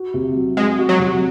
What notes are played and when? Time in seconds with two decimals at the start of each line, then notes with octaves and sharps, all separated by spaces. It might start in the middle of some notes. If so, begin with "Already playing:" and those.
Already playing: F#4
0.14 C3
0.36 F#3
0.57 G#3 C4
0.79 F#4
0.89 F#3
0.99 C3